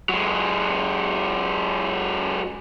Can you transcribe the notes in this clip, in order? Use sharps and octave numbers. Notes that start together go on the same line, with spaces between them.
F#3 G#3